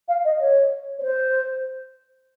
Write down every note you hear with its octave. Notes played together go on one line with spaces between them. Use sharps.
F5
D#5
C#5
C#5
C5